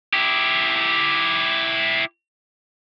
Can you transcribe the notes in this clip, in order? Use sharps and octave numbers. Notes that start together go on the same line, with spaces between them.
E4 G4